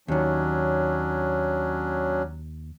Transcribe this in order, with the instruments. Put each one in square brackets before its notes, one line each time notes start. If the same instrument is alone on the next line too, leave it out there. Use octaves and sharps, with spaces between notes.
[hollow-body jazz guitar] D#2 D#3 [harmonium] F#3 C#4 D4